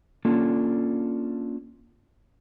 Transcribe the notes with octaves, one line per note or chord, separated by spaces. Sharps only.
A#3 C#4 D4 F4 A4